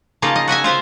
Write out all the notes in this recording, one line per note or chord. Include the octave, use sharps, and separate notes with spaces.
C#3 A#3 D#4 F4 A5
D#5
F#4 D#5 E5 G#5
F4 C5 E5 G#5